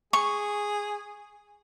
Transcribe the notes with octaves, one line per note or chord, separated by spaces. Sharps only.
G#4 C#6